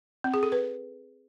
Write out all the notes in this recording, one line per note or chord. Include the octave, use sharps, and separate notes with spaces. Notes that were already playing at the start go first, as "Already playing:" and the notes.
C4
G#4
A4
B4